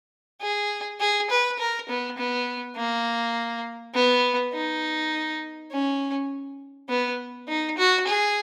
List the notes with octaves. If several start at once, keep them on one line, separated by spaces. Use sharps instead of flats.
G#4
G#4
B4
A#4
B3
B3
A#3
B3
D#4
C#4
B3
D#4
F#4
G#4